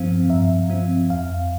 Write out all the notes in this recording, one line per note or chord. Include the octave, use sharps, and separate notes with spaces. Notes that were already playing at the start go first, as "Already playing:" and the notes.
Already playing: G2 F3 C4 F5
G2 E5
F3 C4
F2 F5